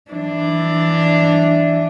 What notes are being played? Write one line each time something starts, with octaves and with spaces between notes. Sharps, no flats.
E3 D4